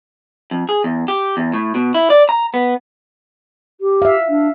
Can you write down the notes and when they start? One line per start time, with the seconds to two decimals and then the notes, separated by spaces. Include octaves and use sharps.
0.51 F2
0.69 G#4
0.84 E2
1.08 G4
1.37 E2
1.53 A2
1.75 B2
1.94 E4
2.10 D5
2.29 A#5
2.54 B3
3.81 G4
4.02 E5 F5
4.29 D4